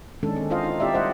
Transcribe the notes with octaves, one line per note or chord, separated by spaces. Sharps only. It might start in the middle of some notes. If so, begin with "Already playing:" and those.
D#3 G#3 C#4 D4 A4
C4
E4 F4 C5 D#5 F5
D#4
C4 E4 G4 D5 E5
G3 C5 D#5 F#5